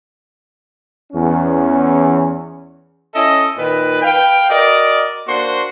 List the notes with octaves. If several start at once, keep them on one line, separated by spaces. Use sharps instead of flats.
E2 C#4
C#4 E4 A4 D#5
A#2 D#3 B4
B4 F5 G5
F#4 A#4 D5 D#5
A#3 D4 F#4 C5 C6